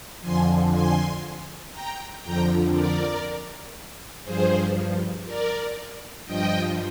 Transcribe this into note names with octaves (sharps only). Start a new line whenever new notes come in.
F2 D3 F3 G#5 C6
G#5 C6
G5 A#5
F2 D3 F3 G5 A#5
A#4 D5
G2 F3 G#4 C5
A#4 D5
G2 F3 D#5 G5